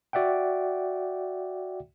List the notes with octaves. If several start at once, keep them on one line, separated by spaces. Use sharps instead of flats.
F#4 D5 E5 F#5 G5